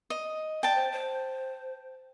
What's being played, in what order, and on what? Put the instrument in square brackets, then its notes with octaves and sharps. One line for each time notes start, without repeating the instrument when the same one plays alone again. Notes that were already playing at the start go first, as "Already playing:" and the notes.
[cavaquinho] D#5
[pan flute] D5 [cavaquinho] G5 A5
[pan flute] C5
C5